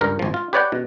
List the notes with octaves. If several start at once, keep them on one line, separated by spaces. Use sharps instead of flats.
C#2 G2 A#4
G#1 F3
F4
G4 B4 C#5 D5 F#5 G5
B2